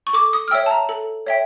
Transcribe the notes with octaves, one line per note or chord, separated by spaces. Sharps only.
C#6
A4 D6
D#6
F6
C#5 E5 G5 E6
A5
A#5
A4
C#5 E5 G5